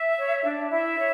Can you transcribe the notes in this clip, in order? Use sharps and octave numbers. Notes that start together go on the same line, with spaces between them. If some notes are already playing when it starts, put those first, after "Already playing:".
Already playing: E5
C#5
D4
E4 E5
C#5